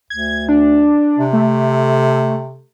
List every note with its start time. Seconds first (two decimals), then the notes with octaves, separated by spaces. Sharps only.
0.10 D2 G#6
0.49 D4
1.18 C3
1.33 A3